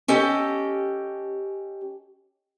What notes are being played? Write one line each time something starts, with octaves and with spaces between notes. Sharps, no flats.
C#4 G4 A4 D#5 G5